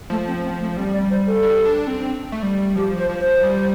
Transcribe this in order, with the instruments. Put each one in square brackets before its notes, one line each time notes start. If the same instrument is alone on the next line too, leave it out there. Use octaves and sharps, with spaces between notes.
[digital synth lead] F3 [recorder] A3
[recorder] C4
C4
A3
[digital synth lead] G3 [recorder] C4
[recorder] D5
C5
A4
[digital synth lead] G3
D4
C4
A3
G3
[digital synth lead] F3 [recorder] G4
[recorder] C5
[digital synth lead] F3
[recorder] C5
[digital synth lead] G3